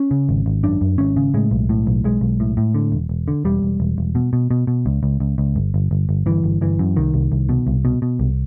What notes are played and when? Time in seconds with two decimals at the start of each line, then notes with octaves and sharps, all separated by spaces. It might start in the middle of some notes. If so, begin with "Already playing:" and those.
Already playing: C#4
0.11 C#3
0.29 G#1
0.46 G#1
0.63 F#2 D4
0.81 F#2
0.98 G#1 C#4
1.17 C#3
1.34 A2 G#3
1.51 B1
1.69 A2
1.87 B1
2.04 B1 G#3
2.21 B1
2.40 A2
2.57 A2
2.74 D3
2.92 E1
3.09 E1
3.28 D3
3.45 E1 G3
3.62 E1
3.80 E1
3.98 E1
4.15 B2
4.33 B2
4.51 B2
4.67 B2
4.86 C#2
5.03 C#2
5.20 C#2
5.38 C#2
5.56 G1
5.74 G1
5.91 G1
6.09 G1
6.26 G1 E3
6.44 G1
6.61 G1 E3
6.79 F#2
6.97 C2 D#3
7.14 C2
7.32 C2
7.49 B2
7.67 C2
7.85 B2
8.02 B2
8.19 C2